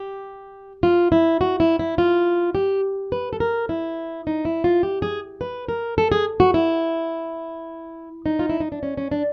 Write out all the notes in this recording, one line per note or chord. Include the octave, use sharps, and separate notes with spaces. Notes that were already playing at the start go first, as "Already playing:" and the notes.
Already playing: G4
F4
E4
F#4
E4
E4
F4
G4
B4
A4
A#4
E4
D#4
E4
F4
G4
G#4
B4
A#4
A4
G#4
F#4
E4
D#4
F4
E4
D#4
D4
C#4
C#4
D4